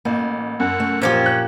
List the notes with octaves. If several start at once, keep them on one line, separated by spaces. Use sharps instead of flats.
A1 A#3
F#2 F#5
A3
A#2 F3 C#4 G4 C5 F5
F#6